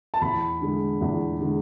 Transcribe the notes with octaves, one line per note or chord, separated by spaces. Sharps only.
A5
E2 B5
D3 G#3
E2
D3 G#3